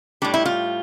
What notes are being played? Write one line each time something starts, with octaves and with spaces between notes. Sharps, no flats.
A2 G3 D4
E4
F4